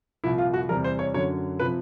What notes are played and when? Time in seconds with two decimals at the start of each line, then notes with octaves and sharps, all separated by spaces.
0.24 C2 A#2 F3 E4
0.38 F4
0.54 F#4
0.69 E2 C3 E3 G3 A#4
0.84 C5
0.99 C#5
1.14 F#2 D3 F#3 C#5
1.60 C3 F3 B4